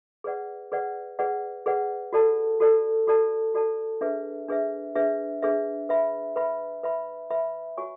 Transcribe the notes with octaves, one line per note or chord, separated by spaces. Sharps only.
G#4 B4 D5 F#5
G#4 B4 D5 F#5
G#4 B4 D5 F#5
G#4 B4 D5 F#5
F#4 A4 D5 A5
F#4 A4 D5 A5
F#4 A4 D5 A5
F#4 A4 D5 A5
D4 G#4 B4 E5
D4 G#4 B4 E5
D4 G#4 B4 E5
D4 G#4 B4 E5
B4 E5 B5
B4 E5 B5
B4 E5 B5
B4 E5 B5
F#4 C#5 G#5 C#6